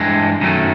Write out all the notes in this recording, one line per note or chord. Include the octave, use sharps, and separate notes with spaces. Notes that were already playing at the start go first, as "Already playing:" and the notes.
Already playing: G2 E3 G#3
F#2 D#3 F#3 A3